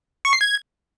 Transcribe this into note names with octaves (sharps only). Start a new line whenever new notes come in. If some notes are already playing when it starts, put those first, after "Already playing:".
C#6
C7
G#6